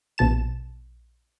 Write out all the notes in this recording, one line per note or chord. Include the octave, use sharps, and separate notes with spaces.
A#1 B2 A5 E7